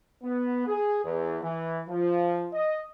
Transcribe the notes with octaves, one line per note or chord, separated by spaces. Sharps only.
B3
G#4
E2
E3
F3
D#5